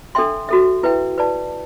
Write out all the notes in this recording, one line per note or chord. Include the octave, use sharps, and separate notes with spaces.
D4 A4 E5 G5 C6
F#4 A4 E5
E4 B4 E5 G5
B4 D5 A5